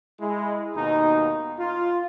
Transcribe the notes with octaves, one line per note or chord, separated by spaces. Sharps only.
G#3 E4
D#2 B2 D#4
F4